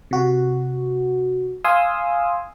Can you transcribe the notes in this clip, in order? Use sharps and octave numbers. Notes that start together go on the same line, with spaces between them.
C3 F#4
F5 G#5 C6 D#6 E6